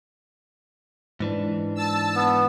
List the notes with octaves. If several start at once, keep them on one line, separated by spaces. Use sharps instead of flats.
G#2 E3 D4
A5 E6
B3